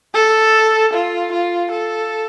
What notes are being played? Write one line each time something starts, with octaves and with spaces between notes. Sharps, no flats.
A4
F4
F4
A4